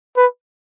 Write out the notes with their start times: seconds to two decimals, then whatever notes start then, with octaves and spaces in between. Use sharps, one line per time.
0.17 B4